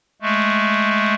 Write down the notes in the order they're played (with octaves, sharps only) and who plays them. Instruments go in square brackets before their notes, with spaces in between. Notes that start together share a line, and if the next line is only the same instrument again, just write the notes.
[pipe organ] G#3 A3